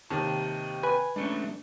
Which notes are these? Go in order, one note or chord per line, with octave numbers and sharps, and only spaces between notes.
D#2 C3 D#3 A5
B4 G#5
G#3 A3 C#4 D4